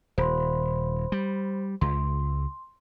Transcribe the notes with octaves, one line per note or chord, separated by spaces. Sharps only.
D#1 C5 B5 C6
G3
C#2 C6